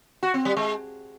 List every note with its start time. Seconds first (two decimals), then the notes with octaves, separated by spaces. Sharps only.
0.23 F#4
0.34 C4
0.45 G3
0.57 G#3